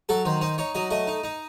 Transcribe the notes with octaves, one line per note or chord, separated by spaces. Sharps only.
F#3 A4
D#3 C5
D#4 C5
D#4 C#5
F#3 D#5
A3 D#5
D#4
D#4